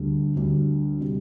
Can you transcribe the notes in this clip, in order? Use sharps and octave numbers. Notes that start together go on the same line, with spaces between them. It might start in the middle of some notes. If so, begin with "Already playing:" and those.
Already playing: D2 D3 G3
D2 D3 G3
C3 G3